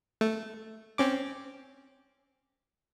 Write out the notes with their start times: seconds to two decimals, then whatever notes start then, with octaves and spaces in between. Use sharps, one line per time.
0.21 A3
0.98 C4 C#4 D6